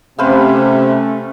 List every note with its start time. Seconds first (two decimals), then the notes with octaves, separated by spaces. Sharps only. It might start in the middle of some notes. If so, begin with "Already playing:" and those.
0.19 C3 A3 C#4 B4 C5 F5